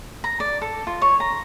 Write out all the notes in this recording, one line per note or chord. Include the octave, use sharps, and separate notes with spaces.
A#5
D5
A4
F4
C#5
A#5